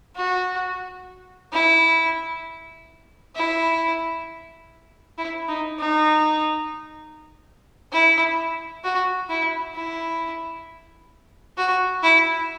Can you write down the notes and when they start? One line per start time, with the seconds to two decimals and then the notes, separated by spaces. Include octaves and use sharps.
0.16 F#4
1.52 E4
3.35 E4
5.18 E4
5.48 D#4
5.79 D#4
7.93 E4
8.84 F#4
9.29 E4
9.75 E4
11.57 F#4
12.03 E4